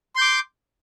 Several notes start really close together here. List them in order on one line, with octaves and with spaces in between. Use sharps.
C6 G6 D6